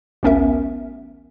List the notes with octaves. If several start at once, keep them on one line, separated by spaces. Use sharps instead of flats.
A1 D2 B3 C#4 A#4 E5